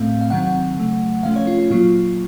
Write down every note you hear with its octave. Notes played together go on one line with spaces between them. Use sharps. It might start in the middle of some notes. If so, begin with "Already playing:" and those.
Already playing: A2 A3 C4 F5
F5
C3 D#3 F#3 C4 F#5
C#3 F#3 A3
C3 F3 A3 C#4 F5
C#5
F4
F4
A#2 F#3 A#3 F4